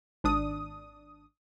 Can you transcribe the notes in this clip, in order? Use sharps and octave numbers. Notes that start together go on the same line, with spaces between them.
G#1 D4 D#6